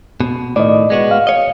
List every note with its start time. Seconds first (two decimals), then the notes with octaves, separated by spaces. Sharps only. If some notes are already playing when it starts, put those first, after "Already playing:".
0.20 B2
0.56 A2 D#3 D5 D#5
0.90 G#3 B3 F#4
1.11 F5
1.27 C#5 D#5